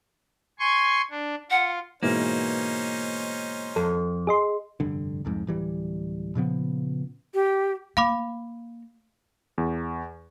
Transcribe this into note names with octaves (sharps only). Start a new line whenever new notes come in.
G#5 C6 C#6
D4
F4 F#5
G#2 B2 E3 A#3 C#4 D#4 C5
F2 A4
G#4 D#5 C6
F1 G2 D3
C2 F2 G#2
D1 E3 G3
A#2 C#3 F3 B3
G4
A#3 F5 B5 D6
E2